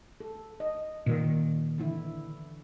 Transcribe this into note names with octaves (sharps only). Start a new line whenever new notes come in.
A4
D#5
A#2 D#3
D3 E3 E4